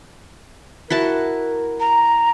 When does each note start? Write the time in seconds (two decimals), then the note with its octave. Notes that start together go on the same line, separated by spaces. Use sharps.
0.90 E4 F#4 A#4 A5
1.80 A#5